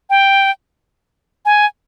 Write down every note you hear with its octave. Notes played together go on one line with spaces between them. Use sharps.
G5
G#5